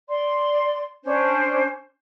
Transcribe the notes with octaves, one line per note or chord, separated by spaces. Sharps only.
D5 C6
C#4 D4 C5